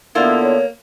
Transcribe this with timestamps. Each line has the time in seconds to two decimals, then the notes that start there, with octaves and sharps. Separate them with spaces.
0.15 D3 A#3 B3 E4 F4
0.42 C#5